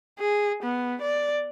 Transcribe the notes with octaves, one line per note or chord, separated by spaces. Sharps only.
G#4
B3
D5